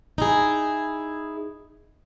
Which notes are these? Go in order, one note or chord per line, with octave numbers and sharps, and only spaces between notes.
D#4 E4 G#4